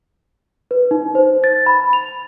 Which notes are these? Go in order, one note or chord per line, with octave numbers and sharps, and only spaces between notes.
B4
D#4
C5
A6
B5
F7